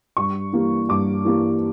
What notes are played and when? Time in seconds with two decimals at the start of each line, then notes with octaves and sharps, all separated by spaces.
0.17 G2 C#6
0.53 E3 G3 A#3
0.89 G2 D6
1.25 E3 G3 A#3